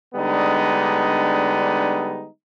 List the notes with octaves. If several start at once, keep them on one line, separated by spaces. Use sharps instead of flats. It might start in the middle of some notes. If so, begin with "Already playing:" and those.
D3 G3 G#3 B3 D4 D#4